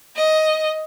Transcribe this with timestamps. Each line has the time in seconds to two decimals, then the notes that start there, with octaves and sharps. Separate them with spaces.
0.16 D#5